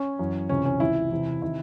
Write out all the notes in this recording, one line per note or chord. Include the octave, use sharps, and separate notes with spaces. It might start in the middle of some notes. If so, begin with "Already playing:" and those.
Already playing: C#4
F#2 E3
C#2 C3 E3 C#4
C#4
C#2 C3 E3 E4
E2 C3 E3
C3 D#3 E4